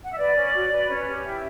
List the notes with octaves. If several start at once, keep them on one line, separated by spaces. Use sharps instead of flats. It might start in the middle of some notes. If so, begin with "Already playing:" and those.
F#5
E5
B4 D5
C#4
F#4
B4
C#4
G4
E4 E5